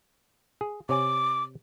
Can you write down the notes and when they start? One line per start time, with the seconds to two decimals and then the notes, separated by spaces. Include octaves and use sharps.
0.61 G#4
0.89 C3 C#5 G#5 D6